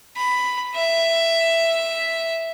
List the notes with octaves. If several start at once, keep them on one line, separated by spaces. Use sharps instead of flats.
B5
E5